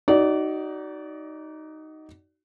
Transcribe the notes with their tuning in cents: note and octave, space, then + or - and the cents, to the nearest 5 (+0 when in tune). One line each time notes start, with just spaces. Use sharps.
D#4 +0 F#4 +30 D5 -20